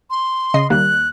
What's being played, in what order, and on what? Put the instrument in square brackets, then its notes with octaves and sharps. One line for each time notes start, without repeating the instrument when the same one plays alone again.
[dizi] C6
[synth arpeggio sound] C#3 D#5 C7
[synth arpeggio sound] D#2 G3 A#3 [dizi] F#6